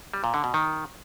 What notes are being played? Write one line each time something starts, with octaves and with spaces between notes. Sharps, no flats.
G3
A#2
D3
B2
D#3